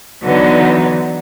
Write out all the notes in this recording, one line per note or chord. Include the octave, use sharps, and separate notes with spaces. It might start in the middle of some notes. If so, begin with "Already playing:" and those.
D3 E3 F#3 B3 D#4